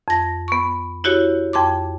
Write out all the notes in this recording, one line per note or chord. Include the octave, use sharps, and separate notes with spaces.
F2 A#6
B3 C#6
E4 F#4 G4 C#5
F2 G5 C6 D6